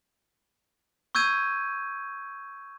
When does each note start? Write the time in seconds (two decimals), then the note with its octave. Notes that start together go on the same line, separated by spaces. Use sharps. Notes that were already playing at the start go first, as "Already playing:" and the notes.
1.15 C#6 E6 G6 G#6 D#7